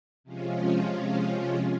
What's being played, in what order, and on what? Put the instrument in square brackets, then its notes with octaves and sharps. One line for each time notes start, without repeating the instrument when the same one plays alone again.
[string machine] C3 F3 G#3 C#4 F4